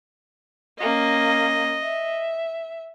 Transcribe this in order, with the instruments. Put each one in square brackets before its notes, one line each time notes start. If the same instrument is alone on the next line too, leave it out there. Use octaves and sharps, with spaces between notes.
[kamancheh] A#3 C#4 [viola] D#5
[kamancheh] E5